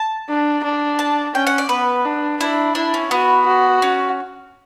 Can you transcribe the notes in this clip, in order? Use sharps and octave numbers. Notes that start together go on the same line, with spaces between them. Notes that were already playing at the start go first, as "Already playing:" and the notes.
Already playing: A5
D4
D4
A5
C#4 G5
F#5
D5
B3 B4
D4
D4 E4
D4 E4
C#4
B3 F#4
F#4
C#4